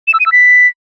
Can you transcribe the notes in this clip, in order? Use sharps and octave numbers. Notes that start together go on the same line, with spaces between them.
E7
E6
D#7
E6
B6